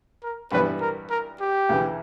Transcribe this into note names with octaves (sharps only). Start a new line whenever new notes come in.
A#4
G2 E3 G3 B3 B4
A#4
A#4
G4
D2 C#3 E3